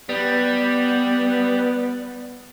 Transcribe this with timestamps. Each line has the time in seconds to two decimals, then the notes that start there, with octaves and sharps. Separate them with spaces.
0.09 G3 B3